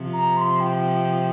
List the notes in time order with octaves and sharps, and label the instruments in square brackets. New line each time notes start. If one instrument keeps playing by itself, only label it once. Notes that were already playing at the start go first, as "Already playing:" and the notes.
Already playing: [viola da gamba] C3 F3
[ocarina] A#5
C6
G5